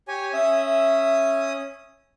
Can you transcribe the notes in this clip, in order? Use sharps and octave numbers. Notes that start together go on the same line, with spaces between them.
G4 C#5 G#5
C#4 E5 D#6